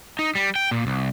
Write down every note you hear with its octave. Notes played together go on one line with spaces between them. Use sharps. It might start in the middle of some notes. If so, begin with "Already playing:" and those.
D#4
G3
G5
A#2
C2